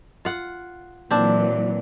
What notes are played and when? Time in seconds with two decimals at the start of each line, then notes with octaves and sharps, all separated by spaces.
0.25 F4 F#5
1.11 A#2 E3 F#3 C4 D4